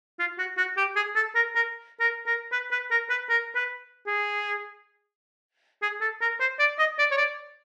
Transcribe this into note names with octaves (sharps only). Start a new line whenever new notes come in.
F4
F#4
F#4
G4
G#4
A4
A#4
A#4
A#4
A#4
B4
B4
A#4
B4
A#4
B4
G#4
G#4
A4
A#4
C5
D5
D#5
D5
C#5
D5